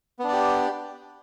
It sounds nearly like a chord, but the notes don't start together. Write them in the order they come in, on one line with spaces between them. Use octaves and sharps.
B3 D4 D5 G4